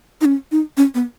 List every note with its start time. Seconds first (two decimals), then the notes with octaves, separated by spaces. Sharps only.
0.21 D#4
0.25 C#4
0.52 D#4
0.77 C#4
0.95 B3